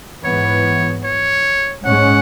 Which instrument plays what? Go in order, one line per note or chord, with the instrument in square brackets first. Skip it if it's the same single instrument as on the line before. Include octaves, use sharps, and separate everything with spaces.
[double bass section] G#2 E3 B3 [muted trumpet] C#5
[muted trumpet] C#5
[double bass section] G#2 G#3 C#4 [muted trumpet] F#5